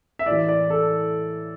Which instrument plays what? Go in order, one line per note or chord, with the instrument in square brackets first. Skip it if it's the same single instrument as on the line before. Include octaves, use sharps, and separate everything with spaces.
[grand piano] E5
A2 E3 D5
D5
A4